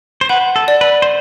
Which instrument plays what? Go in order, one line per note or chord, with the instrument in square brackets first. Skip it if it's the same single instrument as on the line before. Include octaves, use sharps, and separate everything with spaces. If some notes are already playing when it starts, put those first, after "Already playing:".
[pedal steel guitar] C5
[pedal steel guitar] B4 [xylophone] F#5
[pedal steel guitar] A4
[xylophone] D5
[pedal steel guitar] B4
C5